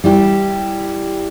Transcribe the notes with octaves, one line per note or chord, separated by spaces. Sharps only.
G3 E4 G4